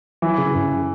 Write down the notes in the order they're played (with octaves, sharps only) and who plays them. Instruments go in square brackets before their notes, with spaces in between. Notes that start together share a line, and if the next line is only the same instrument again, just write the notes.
[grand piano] E3 [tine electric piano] F#3
[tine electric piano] C#3
F#2